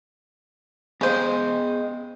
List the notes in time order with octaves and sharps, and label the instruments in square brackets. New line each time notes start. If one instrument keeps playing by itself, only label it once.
[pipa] C#3 C5 [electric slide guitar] B3 G#4 D#5